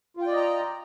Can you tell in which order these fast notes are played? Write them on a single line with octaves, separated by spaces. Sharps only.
F4 G5 D5 D#5 A#5